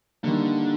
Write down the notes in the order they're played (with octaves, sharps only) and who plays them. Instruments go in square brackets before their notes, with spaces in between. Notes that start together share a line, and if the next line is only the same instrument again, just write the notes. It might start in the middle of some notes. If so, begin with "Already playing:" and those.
[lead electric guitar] D3 [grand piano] D#3 G3 A#3